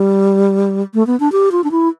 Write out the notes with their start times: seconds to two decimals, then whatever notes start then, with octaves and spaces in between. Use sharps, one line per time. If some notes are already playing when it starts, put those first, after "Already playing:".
Already playing: G3
0.94 A3
1.07 B3
1.20 D4
1.32 G4
1.52 F4
1.64 D4
1.71 E4